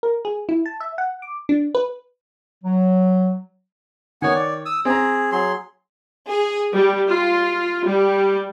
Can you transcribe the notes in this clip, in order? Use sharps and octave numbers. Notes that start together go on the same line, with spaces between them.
A#4
G#4
E4
A5
E5
F#5
D6
D4
B4
F#3
D#3 B3 C#5 F#5 G#5
D5
D#6 E6
C4 G#4 A#5
F#3 G#4 C6
G#4
G3
F4
G3